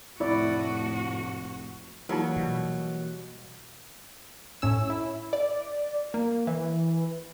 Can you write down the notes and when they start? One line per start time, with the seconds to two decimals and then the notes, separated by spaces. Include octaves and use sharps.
0.20 F1 A2 E4 F#4 D5
2.09 E3 F#3 G3 A#3 D#4 F4 B4
2.36 B2
4.62 A2 C#4 E6
4.90 E4
5.33 D5
6.14 A#3
6.47 E3